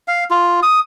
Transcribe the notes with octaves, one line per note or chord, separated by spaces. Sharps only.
F5
F4
D#6